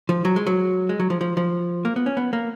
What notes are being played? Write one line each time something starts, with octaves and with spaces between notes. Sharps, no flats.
F3
F#3
G#3
F#3
G#3
F#3
F3
F3
F3
A#3
B3
C#4
B3
A#3